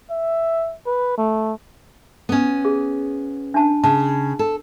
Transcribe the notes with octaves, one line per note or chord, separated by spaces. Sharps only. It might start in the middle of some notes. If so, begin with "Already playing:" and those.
E5
B4
A3
B3 C#4
G#4
D4 A5
C#3 A5
A4